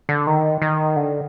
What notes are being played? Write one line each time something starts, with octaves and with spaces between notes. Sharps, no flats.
D3
D#3
D#3
D3